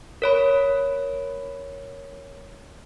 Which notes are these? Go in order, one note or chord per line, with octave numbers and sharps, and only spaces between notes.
A#4 C#5 B5